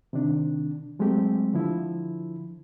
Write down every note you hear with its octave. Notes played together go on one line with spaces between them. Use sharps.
C3 D#3 D4
F#3 G#3 A3 C4 G4
D3 F3 E4